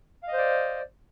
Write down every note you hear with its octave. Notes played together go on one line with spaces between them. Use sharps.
C5 D5 D#5 F5